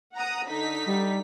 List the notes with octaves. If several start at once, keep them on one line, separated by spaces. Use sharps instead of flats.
F#5 A#5 D#6
D3 D#4 B6
G3